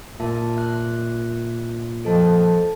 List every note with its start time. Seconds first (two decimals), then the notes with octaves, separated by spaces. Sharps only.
0.20 A#2 E5 A5
0.57 E5 F#6
2.05 F3 A4 D#5 A5